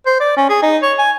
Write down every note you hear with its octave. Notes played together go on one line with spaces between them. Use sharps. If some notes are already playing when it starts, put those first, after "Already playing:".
C5
D5
C#4
G#4
D#4
C#5
G#5